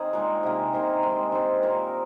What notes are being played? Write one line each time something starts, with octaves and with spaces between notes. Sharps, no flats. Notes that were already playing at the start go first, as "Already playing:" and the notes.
Already playing: D#3 C4 G#4 C5 D#5
A#2 G#3 D#4 A#4
C3 D#3 A#3
C3 D#3 A#3 C5
A#5
D#3 G#3 C4 C6
D#3 G#3 C4
A#2 A#3 D#4 A#4